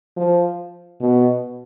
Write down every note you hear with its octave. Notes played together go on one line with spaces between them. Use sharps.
F3
B2